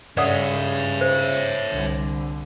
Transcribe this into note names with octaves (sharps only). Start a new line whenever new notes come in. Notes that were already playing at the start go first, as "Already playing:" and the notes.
G2 C#3 C#5 D5 E5 F#5 D#6
C5
C2 D3